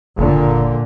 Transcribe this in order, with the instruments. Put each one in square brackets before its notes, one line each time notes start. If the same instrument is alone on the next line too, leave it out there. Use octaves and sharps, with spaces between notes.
[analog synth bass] F#1 [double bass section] A#2 D3